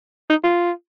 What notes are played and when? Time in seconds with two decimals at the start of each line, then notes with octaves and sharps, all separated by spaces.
0.30 D#4
0.44 F4